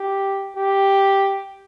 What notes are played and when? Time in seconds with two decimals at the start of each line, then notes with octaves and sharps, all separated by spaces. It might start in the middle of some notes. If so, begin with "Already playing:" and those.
Already playing: G4
0.57 G4